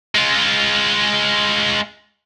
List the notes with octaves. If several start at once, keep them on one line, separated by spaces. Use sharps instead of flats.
G#3 F4